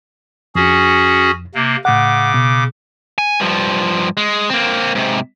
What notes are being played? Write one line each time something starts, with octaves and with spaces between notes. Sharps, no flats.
F2 C#4 F#4 G#4
C3 A#3
A2 C#3 F#5 D6
B2
G#5
G2 F3
G#3
A#3 C4
G#2 C3